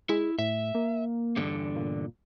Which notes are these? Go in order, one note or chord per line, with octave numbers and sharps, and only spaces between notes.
G#3 E4
A2 E5
A#3
E2 G2 D3
A#2